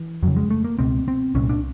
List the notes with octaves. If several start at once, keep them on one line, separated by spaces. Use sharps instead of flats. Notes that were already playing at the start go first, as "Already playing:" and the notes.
Already playing: E3
F2 C#3 F#3
G#3
A3
A#3
C#2 B2 C4
C4
C2 A#2 C#4
D4